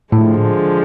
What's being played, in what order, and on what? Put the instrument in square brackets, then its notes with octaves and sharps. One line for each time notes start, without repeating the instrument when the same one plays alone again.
[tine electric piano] A2 [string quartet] D3 F3 G#3